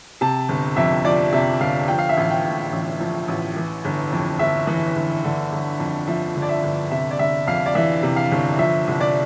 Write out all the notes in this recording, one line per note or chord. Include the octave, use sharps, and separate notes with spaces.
C3 A5
G1
F2 E5
F3 D5
C3 E5
G1 F5
F3 G5
F5
E5
A1 F5
G5
A2
A1
F3
A1
E3
G1
F2
G1 E5
E3
G1
D3
G1
F2
F3 E5
D3
D5
E5
G1
C3 E5
D5
G1 E5
F2 F5
D5
E3 E5
C3
F5
G1
F3 E5
C2
D5